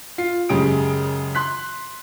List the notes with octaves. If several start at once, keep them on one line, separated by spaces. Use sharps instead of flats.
F4 C7
F#2 C#3 G#3 G4 D#6 D7
C6 F#6 B6